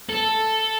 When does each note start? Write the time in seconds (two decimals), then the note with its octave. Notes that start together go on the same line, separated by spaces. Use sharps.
0.09 A4